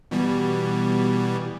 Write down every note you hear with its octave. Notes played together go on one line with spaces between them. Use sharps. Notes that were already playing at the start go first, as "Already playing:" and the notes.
B2 E3 G3